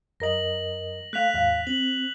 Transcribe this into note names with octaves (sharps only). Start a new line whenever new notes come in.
F#2 A#4 D#5 A#6 F#7
A3 F5 F#6 B6 F7
D#2 G#2 F5
C4 F#7